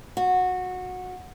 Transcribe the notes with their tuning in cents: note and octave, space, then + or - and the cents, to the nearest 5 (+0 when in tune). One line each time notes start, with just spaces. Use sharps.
F#4 -15